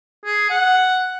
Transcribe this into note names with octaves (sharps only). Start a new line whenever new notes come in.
G#4
F#5